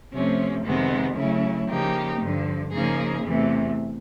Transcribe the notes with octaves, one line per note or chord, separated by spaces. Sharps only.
C3 F3 A3 C#4
F2 C3 D#3 G#3 B3
C#3 F#3 A3 C#4 E4
C#3 F3 A#3 D#4 G4
G2 D3 F3
C#3 F3 A#3 D#4 G#4
E2 C3 E3 A3